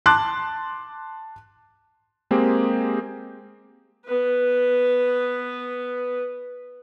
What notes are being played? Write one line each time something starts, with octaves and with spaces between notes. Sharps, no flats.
A5 C6 D6 F#6
G#3 A#3 C4 G4 G#4
B3 B4